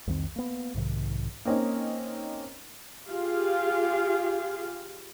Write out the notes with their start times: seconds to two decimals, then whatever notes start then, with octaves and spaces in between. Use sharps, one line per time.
0.07 C2 F2 D#3 C4
0.36 A#3 B3
0.74 B1 G#2 C3 D#3
1.45 A#3 C4 C#4 D#4
3.09 F4 G4 G#4 F5